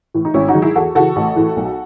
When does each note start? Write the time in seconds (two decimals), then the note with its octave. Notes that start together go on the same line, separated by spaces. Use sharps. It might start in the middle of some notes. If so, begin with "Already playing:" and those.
0.14 A2 E3
0.25 D#4
0.34 G#1 C#4 E4
0.48 D#4 F#4
0.55 G#2 D#3 F#3
0.62 E4 G#4
0.75 E2 F#4 A4
0.95 C#3 E3 F#4 A4
1.16 A1
1.36 A2 E3
1.57 B1